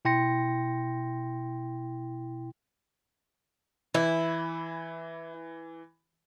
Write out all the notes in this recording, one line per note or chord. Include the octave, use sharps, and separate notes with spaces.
B2 E4 G5 C6 A#6 C#7
E3 E4